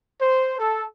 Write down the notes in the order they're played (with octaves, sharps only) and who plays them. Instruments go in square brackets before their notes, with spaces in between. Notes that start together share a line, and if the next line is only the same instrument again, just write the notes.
[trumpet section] C5
A4